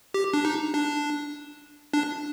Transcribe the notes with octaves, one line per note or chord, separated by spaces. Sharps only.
G4
D4
D#4
D4
D4